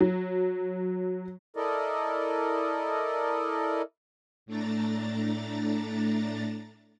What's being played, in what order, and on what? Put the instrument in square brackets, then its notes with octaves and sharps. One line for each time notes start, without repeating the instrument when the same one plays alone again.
[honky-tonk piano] F#3
[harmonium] E4 A4 A#4 D5 D#5
[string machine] A2 A3 D4 A#5 A6